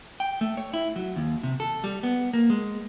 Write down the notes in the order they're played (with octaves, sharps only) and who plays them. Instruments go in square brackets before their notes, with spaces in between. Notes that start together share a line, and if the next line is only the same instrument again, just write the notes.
[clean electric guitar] G5
A3
C#5
E4
F#3
D#2
C3
A4
G3
B3
A#3
G#3